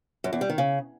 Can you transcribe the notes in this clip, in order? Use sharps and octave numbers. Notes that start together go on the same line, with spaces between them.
F#2
E2
G3
D#3
C#3